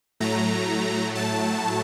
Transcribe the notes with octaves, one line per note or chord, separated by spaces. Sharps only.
A2 F#3 A3 A#5
A5